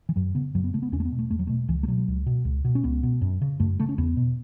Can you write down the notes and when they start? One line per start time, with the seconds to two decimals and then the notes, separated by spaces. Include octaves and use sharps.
0.09 E3
0.16 F#2 F#3
0.35 C#3 B3
0.55 F#2 F#3
0.64 B3
0.73 C#3 A3
0.83 B3
0.92 E2 C#4
1.00 A3
1.05 B3
1.12 B2
1.19 A3
1.31 E2 A3
1.39 F#3
1.47 B2 A3
1.68 C#2 E3
1.83 A3
1.88 B2 F#3
2.08 C#2
2.26 B2
2.45 C#2
2.65 B2
2.75 C#4
2.84 C#2 B3
3.03 B2
3.21 F#2
3.42 C#3
3.60 F#2 A3
3.80 C#3 A3
3.89 C#4
3.98 E2 B3
4.17 B2